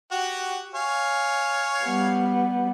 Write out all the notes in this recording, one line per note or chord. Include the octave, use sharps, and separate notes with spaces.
F#4 G4 F#5
C#5 F5 G#5
G3 B3